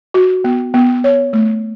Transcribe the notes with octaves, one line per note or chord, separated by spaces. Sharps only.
F#4
B3
B3
C#5
A3